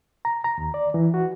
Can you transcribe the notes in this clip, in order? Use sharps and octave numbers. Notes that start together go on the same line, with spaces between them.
A#5
A#5
D#2
D5
E3
F#4